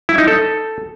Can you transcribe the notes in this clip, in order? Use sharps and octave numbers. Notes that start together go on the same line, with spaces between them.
E4
D#4
A4